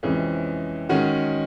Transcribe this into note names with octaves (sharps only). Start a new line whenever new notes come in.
F2 C3 E3 G#3 C#4
D#3 G#3 C#4 F#4